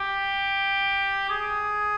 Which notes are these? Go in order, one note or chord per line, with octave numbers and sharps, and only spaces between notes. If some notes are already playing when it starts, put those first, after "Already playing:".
Already playing: G4
G#4